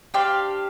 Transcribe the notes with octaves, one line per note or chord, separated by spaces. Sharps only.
D4 G4 C5 F5